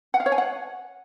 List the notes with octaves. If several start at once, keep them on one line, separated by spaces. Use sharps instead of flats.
F#5
F5
C#5
G#5
F#5